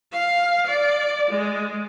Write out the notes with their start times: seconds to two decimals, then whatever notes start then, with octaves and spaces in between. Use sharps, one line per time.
0.12 F5
0.67 D5
1.31 G#3